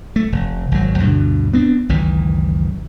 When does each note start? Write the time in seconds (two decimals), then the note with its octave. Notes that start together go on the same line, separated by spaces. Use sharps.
0.16 A3
0.32 F1
0.72 G#1 F#3
1.00 D2 G2 B2 D4
1.53 B3 C4 D4
1.89 F#1 C#2 D#3 E3